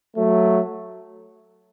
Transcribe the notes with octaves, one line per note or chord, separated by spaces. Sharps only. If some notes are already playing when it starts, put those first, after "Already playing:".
F#3 A3